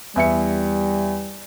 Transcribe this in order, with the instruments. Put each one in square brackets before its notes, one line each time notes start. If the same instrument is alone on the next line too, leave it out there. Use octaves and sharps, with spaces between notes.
[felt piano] E2 E5 C#7 [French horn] G3